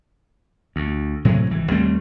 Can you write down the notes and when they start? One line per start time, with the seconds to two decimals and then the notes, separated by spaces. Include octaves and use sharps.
0.76 D2
1.25 A2 C3 F#3 G#3
1.50 G#1 E3
1.71 D#2 G3 A3 C4